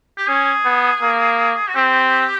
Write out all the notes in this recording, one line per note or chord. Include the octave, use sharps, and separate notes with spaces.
G4
C#4 G#4
B3
A#3
F#4
C4 G4